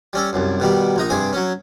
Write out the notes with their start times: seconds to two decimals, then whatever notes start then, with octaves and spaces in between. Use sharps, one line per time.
0.13 G3 C#4 A4
0.33 C2 F#2
0.60 B2 D#3 G3
0.96 A#1 D#4 D#5
1.10 G2 C3 G#4 G#5
1.33 F#3 C#4